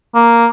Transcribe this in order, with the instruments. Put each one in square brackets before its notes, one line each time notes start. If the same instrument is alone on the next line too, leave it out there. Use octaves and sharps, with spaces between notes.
[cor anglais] A#3